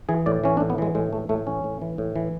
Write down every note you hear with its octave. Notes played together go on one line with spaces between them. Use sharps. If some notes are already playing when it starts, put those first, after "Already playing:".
E3 G#4
A2 D5
E3 C#4
D4
A2
B3
E3 G#3
A2 G#3
E3 A3
A2 A3
E3 C#4
A2
E3
A2
E3